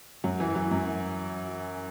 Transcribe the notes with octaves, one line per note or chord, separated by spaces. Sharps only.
F#2 F#3
E3
E3 F#3
F#2